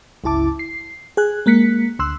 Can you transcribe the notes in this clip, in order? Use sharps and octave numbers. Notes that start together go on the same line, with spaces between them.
G1 C#2 E4 A5 D6
C7
G#4 G#5 F#6
G#3 A#3 F#6 B6 C#7
D2 C6 E6 F#6